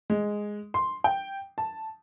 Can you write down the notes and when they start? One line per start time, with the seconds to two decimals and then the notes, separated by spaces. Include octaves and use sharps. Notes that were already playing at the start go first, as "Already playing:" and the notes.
0.10 G#3
0.74 C6
1.04 G5
1.58 A5